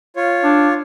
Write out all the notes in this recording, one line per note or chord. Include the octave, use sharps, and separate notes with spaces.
F4 C#5
D4